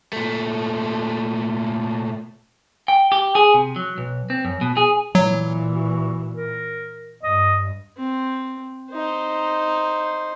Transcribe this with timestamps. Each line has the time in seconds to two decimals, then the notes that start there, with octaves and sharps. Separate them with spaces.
0.13 A#2 A3
2.88 G5
3.12 G4
3.35 G#4
3.54 C3
3.76 F#3
3.98 B1
4.30 C4
4.45 F#2
4.61 B2
4.77 G#4
5.15 A#2 E3 F#3
5.72 F#4
6.34 A#4
7.23 G2 D#5
7.97 C4
8.91 D#4 C5